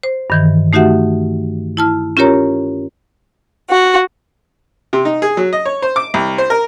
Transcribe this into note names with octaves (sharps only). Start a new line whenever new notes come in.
C5
G2 D#3 E3
A3 D#4 F#4 G4 E5 F#5
E4 A5 F6
C#4 F4 G4 A#4 C#5 A#5
F#4
C3
D#4
G#4
F#3
D#5
C#5
C5
D6
C2
C5
A#4